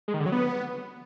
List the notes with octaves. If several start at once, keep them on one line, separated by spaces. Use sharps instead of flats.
G#3
D#3
D3
F#3
B3